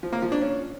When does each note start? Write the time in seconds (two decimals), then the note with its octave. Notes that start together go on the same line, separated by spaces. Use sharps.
0.03 F3
0.13 A#3
0.22 F3
0.32 D4
0.41 C#4